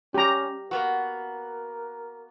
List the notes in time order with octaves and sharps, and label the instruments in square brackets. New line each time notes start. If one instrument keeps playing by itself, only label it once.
[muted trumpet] C#4 [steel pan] G4 A#5
[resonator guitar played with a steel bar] A#3 B3 F#4 [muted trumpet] A#4